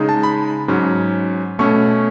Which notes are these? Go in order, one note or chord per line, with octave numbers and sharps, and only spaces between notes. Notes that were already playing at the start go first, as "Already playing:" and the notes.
Already playing: C#3 G#3 D#4
A5
B5
G#2 F#3 C#4
B2 A3 C#4 C#6